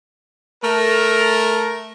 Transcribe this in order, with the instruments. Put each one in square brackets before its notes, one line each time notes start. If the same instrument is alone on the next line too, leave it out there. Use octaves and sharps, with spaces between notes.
[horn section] A3 A#4